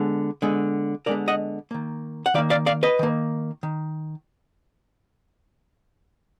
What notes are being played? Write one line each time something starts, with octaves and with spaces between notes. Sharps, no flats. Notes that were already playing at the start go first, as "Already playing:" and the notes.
Already playing: D3 G#3 B3
D3 G#3 B3
D3 G#3 B3 A#4 D5
D#5 F#5
D#3 A#3
F#5
D#3 A#3 D5 F5
D5 F5
D5 F5
B4 D#5
D#3 A#3
D#3